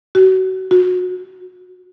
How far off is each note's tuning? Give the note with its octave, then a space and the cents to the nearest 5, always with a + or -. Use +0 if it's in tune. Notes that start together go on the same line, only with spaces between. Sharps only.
F#4 +30
F#4 -25